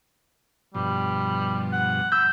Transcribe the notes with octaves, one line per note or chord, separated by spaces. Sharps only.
G2 B2 F3 G3
F#5
B5 E6 G6